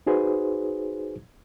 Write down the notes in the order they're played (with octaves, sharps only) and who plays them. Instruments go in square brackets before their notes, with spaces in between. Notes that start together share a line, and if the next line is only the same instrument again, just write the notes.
[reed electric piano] D#4 F#4 G#4 B4 C5